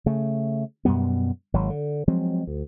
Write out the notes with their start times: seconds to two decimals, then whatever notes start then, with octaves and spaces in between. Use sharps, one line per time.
0.06 C#3 A3
0.85 F#2 B2 G3 B3
1.54 G#1 F#3
1.70 D3
2.08 F3 F#3 G#3 C4
2.47 D2